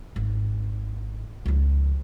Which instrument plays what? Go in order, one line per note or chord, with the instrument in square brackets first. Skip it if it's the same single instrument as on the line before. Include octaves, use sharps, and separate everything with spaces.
[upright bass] G#1
C#2 F3